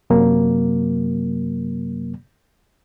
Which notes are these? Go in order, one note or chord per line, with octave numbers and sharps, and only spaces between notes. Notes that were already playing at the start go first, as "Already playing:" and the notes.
F#2 C3 F#3 A#3